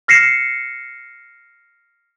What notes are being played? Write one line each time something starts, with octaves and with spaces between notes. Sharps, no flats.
F6 A#6 C7 C#7 E7